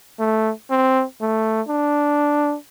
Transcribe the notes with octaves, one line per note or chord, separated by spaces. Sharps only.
A3
C4
A3
D4